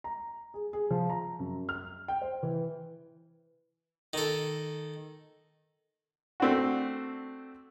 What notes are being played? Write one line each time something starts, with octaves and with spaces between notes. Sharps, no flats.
A#5
G#4
G#4
F3
A#5
F#2
F6
G5
C5
E3
D#3 A4
A3 C4 D4 F#4